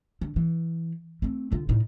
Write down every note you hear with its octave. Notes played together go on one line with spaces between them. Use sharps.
D3
E3
A3 C4
D3 F4
A2 D#4